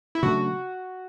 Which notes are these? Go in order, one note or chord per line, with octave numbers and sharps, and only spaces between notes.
E4
C#3 F#3 A3 D4 F#4